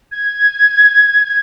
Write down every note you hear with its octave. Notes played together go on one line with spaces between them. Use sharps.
G#6
G#6